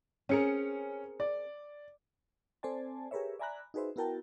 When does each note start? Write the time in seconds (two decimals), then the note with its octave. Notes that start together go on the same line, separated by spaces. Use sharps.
0.29 C4 C#4 G#4 A#4 C#7
1.20 D5
2.63 C4 A4 C5 D5 G#5 A5
3.11 G4 G#4 A#4 B4 C#5 E5
3.39 D5 E5 G#5 A#5 B5 F#6
3.74 D#4 F#4 G#4 B4 C5 E5
3.96 B3 E4 F#4 A#4 G5 A5